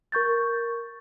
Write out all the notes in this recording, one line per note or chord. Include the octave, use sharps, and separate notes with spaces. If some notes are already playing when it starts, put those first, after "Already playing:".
A#4 C#6 G6 A6